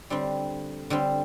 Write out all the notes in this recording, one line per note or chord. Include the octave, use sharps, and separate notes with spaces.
D3 G3 C4
D3 G3 C4